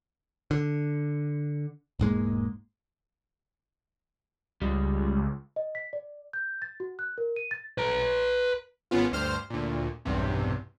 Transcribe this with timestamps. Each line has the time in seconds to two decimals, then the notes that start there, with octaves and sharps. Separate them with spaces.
0.51 D3
1.99 E1 G#2 G#3 A#3
4.62 C#2 G3 G#3
5.56 D#5
5.75 B6
5.93 D5
6.33 G6
6.62 A6
6.80 F#4
6.99 F#6
7.18 A#4
7.36 D#7
7.51 A6
7.78 B4 A#5
8.91 G#1 C#3 B3 F4
9.12 D2 G2 C5 F6
9.50 D2 A#2
10.05 B1 E2 G2 C3